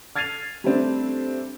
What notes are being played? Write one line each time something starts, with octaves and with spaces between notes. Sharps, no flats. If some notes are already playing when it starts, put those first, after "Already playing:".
F6 G#6 A6 C7 D#7 F7
G3 A3 C4 D4